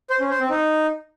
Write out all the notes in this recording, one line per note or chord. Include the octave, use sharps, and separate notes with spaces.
C5
C#4
C5
C4
D#4